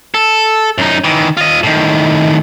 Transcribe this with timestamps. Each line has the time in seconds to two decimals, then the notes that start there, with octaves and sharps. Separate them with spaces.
0.14 A4
0.78 F#2 D#4
1.04 D#3 E3
1.37 F4 D#5
1.63 A2 D#3